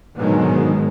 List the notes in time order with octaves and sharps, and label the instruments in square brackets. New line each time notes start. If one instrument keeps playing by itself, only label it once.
[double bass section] G#2 B2 D3 D#3 F#3 G#3